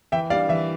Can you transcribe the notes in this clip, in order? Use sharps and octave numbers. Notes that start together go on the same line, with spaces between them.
E3 E5 G5
G3 D4 D5 F5
E3 E5